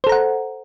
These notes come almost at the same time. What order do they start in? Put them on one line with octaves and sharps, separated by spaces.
C5 A4 A#5 F#5